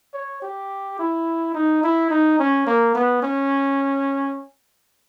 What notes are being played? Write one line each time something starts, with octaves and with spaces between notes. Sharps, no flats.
C#5
G4
E4
D#4
E4
D#4
C#4
A#3
B3
C#4